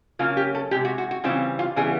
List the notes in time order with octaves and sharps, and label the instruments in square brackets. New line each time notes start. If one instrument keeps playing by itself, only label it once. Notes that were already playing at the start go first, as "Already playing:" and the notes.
[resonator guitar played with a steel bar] C#3 F#3 A#3 C#4 F4
G4
A4
C3 D#3 G#3 G4
F#4
F#4
F#4
C#3 E3 G3 C4 F4
F4
C#3 E3 G3 B3 G#4